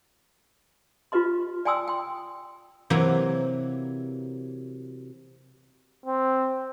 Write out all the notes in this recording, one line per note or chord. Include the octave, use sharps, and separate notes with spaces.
F4 G4 B4 D#5 C6
D5 G5 G#5 C6 D#6 E6
G5 C6
C3 E3 F#3 A#3
C4